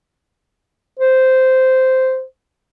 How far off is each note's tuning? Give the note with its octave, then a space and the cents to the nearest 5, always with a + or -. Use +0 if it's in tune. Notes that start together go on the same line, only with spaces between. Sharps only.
C5 -10